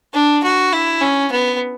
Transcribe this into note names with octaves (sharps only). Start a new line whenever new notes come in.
D4
F#4
E4
C#4
B3